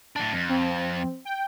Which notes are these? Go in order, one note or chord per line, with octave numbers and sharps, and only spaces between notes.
A2 D4
F2
C4
G5